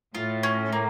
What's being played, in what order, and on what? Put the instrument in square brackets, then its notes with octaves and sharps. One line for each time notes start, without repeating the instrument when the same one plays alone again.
[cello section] A2 [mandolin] F4
[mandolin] C#4
A#3